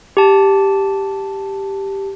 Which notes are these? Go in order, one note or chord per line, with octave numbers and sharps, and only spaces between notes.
G4 A5